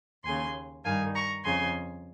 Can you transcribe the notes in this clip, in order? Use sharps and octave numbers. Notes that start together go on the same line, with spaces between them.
D#2 C#3 G#5 C6
G2 D#3 F5 G#5
A#5 C#6
F2 C#3 G#5 C6